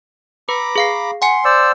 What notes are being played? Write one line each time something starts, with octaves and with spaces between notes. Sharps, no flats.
B4 A#5 B5 D6
G#4 F5 C7
F#5 G#5 C6 C#7
C5 D5 E6